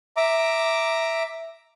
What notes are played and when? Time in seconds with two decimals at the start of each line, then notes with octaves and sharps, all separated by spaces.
0.17 E5 A#5 D6